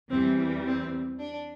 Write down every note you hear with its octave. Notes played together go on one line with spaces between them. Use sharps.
E2 E3 G3 C4
C4
D4